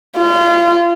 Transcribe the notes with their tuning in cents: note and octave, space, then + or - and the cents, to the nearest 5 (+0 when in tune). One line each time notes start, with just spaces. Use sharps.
F4 -30